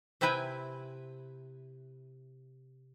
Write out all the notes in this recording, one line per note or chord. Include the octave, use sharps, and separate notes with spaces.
C3 C4 E4 B4 G5 G#5